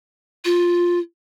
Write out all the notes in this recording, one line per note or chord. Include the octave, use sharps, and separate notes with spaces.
F4